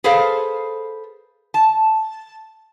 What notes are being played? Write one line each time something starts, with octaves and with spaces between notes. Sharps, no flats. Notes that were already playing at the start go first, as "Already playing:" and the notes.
G#4 A4 B4 C5 F5
A5